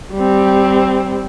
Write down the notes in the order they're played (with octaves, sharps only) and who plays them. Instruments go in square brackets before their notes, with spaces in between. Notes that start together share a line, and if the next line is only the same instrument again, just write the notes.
[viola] G3 C4